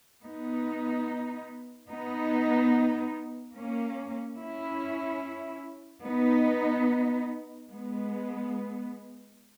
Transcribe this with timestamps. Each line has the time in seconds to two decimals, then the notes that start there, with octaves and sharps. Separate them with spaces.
0.25 B3 D#4
1.90 B3 D#4
3.55 A#3 C#4
4.38 C#4 E4
6.03 B3 D#4
7.69 G#3 B3